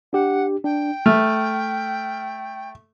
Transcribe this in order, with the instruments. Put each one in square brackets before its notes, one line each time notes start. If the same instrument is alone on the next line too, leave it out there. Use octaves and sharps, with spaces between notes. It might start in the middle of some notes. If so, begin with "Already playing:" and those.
[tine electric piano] D4 G4 [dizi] F#5
[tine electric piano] D4 [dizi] G5
[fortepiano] A3 [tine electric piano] F6